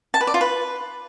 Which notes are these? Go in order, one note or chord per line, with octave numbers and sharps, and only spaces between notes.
A5
B4
D5
F4
B4